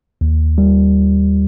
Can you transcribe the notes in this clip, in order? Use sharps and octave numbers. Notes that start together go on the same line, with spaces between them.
D#2
G3